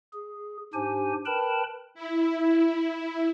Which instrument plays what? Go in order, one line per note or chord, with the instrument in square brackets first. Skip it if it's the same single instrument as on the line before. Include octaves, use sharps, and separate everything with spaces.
[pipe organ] G#4
G#2 D4 G4 C5 G#5
A#4 B4 G5 A5 B5
[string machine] E4